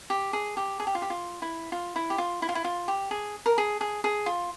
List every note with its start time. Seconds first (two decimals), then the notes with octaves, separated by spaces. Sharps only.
0.10 G4
0.33 G#4
0.57 G4
0.80 G#4
0.87 G4
0.95 F4
1.02 G4
1.10 F4
1.42 E4
1.72 F4
1.96 E4
2.10 G4
2.18 F4
2.42 E4
2.49 F4
2.55 E4
2.64 F4
2.88 G4
3.11 G#4
3.46 A#4
3.58 G#4
3.81 G#4
4.04 G#4
4.26 F4